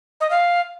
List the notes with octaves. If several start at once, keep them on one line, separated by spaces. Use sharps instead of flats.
D#5
F5